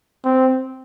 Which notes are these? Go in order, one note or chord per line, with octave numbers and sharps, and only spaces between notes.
C4